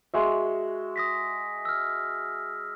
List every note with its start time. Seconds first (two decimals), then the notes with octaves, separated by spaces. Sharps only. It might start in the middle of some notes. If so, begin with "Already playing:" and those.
0.14 G#3 F#4 E5
0.96 D#6 A#6 B6
1.65 E6 F6